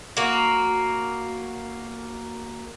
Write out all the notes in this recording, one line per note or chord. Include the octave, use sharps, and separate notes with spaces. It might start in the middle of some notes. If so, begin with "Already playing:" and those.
A#3 F#4